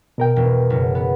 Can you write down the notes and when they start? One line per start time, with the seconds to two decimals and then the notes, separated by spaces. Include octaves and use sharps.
0.18 B2 A#4 G5
0.36 E1
0.70 F#1
0.95 B3